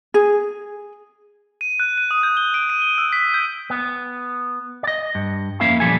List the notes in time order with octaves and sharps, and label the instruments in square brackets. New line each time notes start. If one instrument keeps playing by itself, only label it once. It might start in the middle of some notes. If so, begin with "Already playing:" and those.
[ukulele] G#4
[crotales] D#7
F#6
D#7
D#6
G6
G7
D7
D#7
G7
E6
B6
G6
[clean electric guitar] B3
D5 D#5
G2
F2 A#3 C#4 E4 E5 F5
A#2 F3 G3 A4 G#5